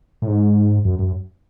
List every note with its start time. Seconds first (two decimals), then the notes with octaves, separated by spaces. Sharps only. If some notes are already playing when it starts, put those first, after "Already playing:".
0.22 A2
0.28 G#2
0.85 F#2
0.99 F#2